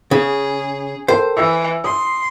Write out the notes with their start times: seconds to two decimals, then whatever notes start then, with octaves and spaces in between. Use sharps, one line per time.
0.11 C#3 G#4
1.08 A4 A#4 C5 G5
1.37 E3 E6
1.84 C6 D#6